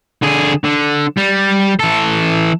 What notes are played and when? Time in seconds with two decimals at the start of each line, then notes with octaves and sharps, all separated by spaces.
0.22 D3 G#4
0.64 D3
1.17 G3
1.80 E3 A4